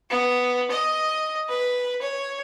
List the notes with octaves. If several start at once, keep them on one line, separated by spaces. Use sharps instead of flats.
B3
D#5
B4
C#5